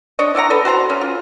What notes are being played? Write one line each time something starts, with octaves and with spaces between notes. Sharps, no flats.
D4 C#5 D#5
E4 D5 F#5 A#5
A4 B4
F#4 C5 A5 A#5
E3 C#4
F4